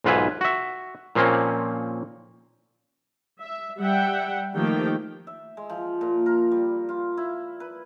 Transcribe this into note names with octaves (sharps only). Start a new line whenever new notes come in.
B1 G#2 F4 B4 E5 G#5
F#4 E5
A#2 F3 A#3 C4 C#4
E5
G3 E5 F#5 G5
D#3 F3 A3 A#3 G4 G5
E5
G#3
F3
A#2
A#4
G3
F4
E4
B4